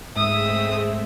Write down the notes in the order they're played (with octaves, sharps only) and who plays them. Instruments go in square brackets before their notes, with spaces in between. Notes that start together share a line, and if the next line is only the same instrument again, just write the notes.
[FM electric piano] G#2 [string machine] G#3 A3 C4 [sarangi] E5 [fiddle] D#6